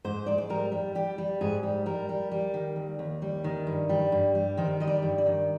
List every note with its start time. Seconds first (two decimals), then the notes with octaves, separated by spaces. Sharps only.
0.04 G#2 C5
0.26 G#2 D5
0.38 C5
0.50 G3 A#4
0.72 G3
0.95 G3 G4
1.18 G3
1.41 G#2 G#4
1.63 G3
1.86 G3 A#4
2.09 G3
2.32 G3
2.54 D#3
2.76 D#2
2.99 D#2
3.22 G3
3.44 D#3
3.67 G2
3.89 G3
4.12 G2
4.35 G3
4.57 D#3 C5
4.80 G3 D#5
4.87 D5
5.03 G2
5.18 D5
5.26 D#3